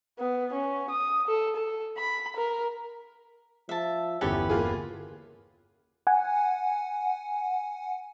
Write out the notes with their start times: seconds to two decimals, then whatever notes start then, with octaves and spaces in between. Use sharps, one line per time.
0.19 B3
0.53 C#4
0.90 D#6
1.27 A4
1.56 A4
1.97 B5
2.36 A#4
3.69 F3 E5 A5
4.21 G1 E2 E3 C#4 G4 A4 B4
4.49 A#3 F4 G#4
6.07 F#5 G#5